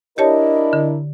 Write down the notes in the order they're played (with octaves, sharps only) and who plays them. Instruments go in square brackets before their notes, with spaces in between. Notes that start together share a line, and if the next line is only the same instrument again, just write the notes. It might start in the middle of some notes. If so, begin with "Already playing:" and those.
[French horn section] D4 E4 A#4 [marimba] G4 C#5 A5 [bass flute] D#5
[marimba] D3